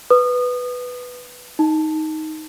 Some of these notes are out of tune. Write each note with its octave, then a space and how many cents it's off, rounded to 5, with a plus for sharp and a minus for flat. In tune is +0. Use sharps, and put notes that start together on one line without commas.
B4 +0 D#6 -25
D#4 +10 A5 +0